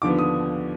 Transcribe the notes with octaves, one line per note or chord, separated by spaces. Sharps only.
D#2 D3 F3 B3 D6
D#6